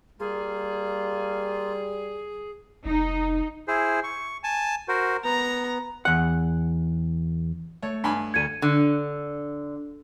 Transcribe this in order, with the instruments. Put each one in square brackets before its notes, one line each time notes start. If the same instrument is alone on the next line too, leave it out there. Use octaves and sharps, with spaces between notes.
[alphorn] G3 [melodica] A#3 F4 [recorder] G#4
[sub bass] F1 [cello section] D#4
[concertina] E4 G#4 C5
C#6
G#5 A5
F#4 A#4 C5
[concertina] B3 [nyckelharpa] A#5
[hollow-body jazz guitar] E2 F#5
[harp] A3 [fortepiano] C#5
[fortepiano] G2 G#5 B5
[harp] D2 C#7 [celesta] G#6 D#7
[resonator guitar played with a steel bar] D3